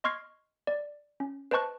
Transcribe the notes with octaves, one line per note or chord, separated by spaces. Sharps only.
D#5 C6 C#6 F6 G#6 C7
D5
C#4
B4 C5 D#5 A5 C#6 F#6